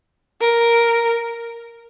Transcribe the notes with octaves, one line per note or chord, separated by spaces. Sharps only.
A#4